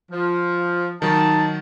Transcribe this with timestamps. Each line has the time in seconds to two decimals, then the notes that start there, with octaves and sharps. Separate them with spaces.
0.12 F3
1.02 D#3 F#3 D#4 A5